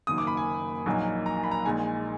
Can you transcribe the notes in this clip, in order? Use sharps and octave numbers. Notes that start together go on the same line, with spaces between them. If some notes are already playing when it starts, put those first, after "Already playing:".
F#1 F#2 D#3 A#3 D#6
D6
B5
G#5
A#1 A#2 F#3 A#3 D#4
A#5
B5
A#5
A#1 A#2 G#3 D#4 G#5